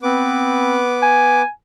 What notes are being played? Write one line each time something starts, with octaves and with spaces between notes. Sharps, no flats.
B3 C4 B4 D6
G#5